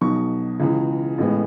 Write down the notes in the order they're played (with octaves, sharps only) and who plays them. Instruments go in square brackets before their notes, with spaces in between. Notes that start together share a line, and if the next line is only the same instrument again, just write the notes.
[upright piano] B1 B2 F#3 C#6
C#2 C#3 E3
A1 A2 G#3 B3